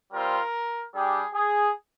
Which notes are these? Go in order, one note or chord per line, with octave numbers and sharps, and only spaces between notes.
G3 C4 F4 A#4
G3 D4 G4 G#4
G#4